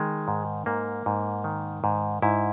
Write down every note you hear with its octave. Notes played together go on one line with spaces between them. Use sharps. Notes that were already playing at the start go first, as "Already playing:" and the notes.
Already playing: D#3 G#3
G#2
G#2 A#3
G#2
D#3
G#2
G#2 E4